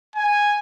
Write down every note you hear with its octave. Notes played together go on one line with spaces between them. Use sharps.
G#5